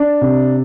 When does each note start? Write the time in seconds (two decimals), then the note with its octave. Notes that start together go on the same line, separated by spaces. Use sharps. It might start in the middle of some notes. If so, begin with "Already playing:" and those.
Already playing: D4
0.21 C3